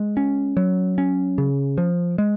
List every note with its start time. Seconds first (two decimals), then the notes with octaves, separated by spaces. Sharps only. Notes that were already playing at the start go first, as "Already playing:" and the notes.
Already playing: G#3
0.17 C#4
0.57 F#3
0.98 C#4
1.38 C#3
1.78 F3
2.18 G#3